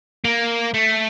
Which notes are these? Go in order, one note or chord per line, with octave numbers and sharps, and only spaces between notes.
A#3
A3